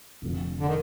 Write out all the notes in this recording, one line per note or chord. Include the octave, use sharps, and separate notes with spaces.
F1 F2 D3 F3
D3
D#3